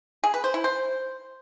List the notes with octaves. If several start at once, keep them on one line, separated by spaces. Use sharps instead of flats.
G#4
B4
C5
E4
C5